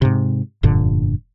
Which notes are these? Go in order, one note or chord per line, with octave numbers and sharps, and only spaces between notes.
G#2 C3
F1 G2 A#2 D3